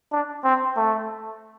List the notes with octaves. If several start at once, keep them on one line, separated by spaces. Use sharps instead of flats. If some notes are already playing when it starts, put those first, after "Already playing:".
D4
C4
A3